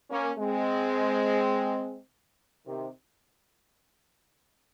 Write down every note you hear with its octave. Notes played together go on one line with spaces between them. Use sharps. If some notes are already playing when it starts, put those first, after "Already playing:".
A#3 C#4
G#3 C4
C3 D#3